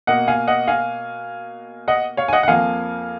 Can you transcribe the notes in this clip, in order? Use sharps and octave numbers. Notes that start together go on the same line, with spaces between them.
B2 A#3 D#5 F#5
F5 G#5
D#5 F#5
F5 G#5
D#5 F#5
C#5 F5
G#5
D#5 F#5
F#5
F2 F3 A#3 F5 G#5